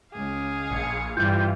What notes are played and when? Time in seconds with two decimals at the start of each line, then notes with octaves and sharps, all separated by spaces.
0.13 C#2 G#4 F5
0.71 A#1 C#7
1.17 G2 E3 G3 F4 G5